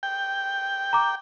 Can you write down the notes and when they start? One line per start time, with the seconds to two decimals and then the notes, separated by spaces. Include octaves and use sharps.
0.03 G5
0.93 A#5 D6